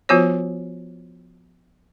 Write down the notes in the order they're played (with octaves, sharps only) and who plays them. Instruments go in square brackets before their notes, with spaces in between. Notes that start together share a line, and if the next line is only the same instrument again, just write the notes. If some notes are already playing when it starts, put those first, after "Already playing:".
[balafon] F3 B3 F4 F#4 C5 C#5